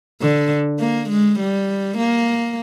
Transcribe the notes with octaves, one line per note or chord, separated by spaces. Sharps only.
D3
A#3
G#3
G3
A#3